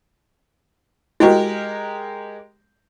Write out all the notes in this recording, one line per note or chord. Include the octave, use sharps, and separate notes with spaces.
G#3 E4 F#4 G4 A#4